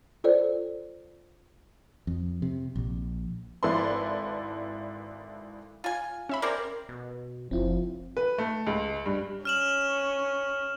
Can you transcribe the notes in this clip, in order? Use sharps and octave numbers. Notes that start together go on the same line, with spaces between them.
F4 A4 C5 D5
F2
C3
A#1
G#1 E4 A4 B4 D5 C6
F4 G#5
C#4 E5 B5
C4 G#4 A#4 D5
B2
F#1 F3 C4 E4
B4
A3
C#2
G2
C#4 F6 E7 F#7